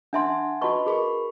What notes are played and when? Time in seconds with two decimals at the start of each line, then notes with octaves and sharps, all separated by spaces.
0.13 D4 E5 F#5 G#5 A5 C6
0.62 F#4 B4 D#5 A5 B5 C#6
0.86 G#4 A#4 B5 C#6